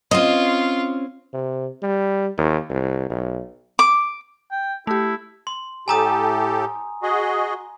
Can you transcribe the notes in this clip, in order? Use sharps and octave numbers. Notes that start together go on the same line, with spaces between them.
C4 C#4 F4 D#5
C3
G3
D#2
C2
B1
D6
G5
A3 E4 G4
C6
A2 G4 A4 G#5 A#5 D#6
F#4 G#4 D#5